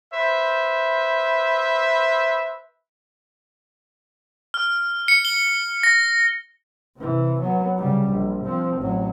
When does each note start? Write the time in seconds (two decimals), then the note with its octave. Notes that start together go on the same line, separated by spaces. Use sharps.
0.13 B4 C5 E5
4.54 F6
5.08 C#7
5.25 G7
5.83 A#6
6.96 C3 E3
7.41 F#3 B3
7.78 C#3 G3
8.11 A#1
8.45 F3 C4
8.78 A1 F#3